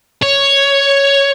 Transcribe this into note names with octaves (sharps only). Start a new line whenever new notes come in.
C#5